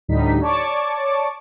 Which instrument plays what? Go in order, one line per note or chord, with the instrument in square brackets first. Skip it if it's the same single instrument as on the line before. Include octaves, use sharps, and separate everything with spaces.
[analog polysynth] D2 A2 D3 G3 D#4 B6
C#5 D5 A5 C#6 D6